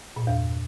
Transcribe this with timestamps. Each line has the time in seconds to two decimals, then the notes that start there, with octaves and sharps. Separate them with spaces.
0.16 A#2
0.22 G2
0.27 E2